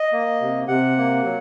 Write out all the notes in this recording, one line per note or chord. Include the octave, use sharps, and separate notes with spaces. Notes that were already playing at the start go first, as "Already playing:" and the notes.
Already playing: D#5
A#3
C3
C3 F#5
A#3
F#3